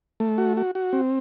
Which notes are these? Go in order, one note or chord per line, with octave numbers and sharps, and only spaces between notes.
A3
F#4
F#4
F#4
C4